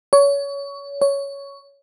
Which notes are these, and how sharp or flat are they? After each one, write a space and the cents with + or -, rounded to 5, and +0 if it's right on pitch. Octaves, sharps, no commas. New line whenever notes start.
C#5 +25
C#5 +10